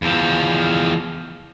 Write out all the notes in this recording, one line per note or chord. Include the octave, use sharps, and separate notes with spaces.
E2 F3